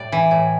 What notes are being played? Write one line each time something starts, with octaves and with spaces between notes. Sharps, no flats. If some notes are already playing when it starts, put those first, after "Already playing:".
Already playing: A2 G3 D5
E3
A2